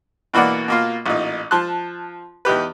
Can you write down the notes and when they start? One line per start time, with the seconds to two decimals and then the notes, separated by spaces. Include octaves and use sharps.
0.34 B2 E3 A#3 D5 F#5
0.68 B2 A#3 F4
1.06 A1 A#2 D#4
1.51 F3 A5 C6 F#6
2.45 E2 D#4 G4 B4